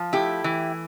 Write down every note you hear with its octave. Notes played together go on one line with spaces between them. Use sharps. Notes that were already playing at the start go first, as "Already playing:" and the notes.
Already playing: F3
A3 E4 G4
E3